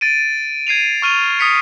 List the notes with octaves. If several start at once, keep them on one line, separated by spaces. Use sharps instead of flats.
A6 D7 D#7
G#6 C7 D#7 F7
C#6 F6 D#7 F7 G7
D#6 F6 B6 C#7